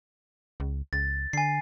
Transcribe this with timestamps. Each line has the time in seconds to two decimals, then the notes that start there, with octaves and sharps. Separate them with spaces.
0.60 C#2
0.93 C#2 A6
1.33 D3 G#5 C7